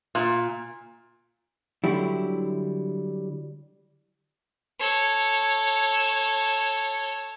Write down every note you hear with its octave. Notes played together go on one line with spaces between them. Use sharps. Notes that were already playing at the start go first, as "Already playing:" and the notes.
A#2
D3 F#3 G3 E4
A4 C#5